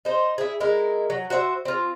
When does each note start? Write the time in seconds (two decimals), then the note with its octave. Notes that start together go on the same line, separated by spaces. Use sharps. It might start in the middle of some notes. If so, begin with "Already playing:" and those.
0.05 D#4 C5
0.38 E4 G#4
0.60 G#3 E4 A#4
1.10 F#3
1.30 F#4 C5 D5 E5
1.65 C4 F4